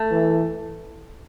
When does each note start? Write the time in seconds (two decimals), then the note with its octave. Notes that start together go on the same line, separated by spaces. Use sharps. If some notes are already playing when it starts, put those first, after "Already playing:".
Already playing: A3
0.11 E3